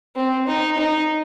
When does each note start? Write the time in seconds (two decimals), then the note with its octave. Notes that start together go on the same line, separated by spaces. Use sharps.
0.15 C4
0.47 D#4
0.78 D#4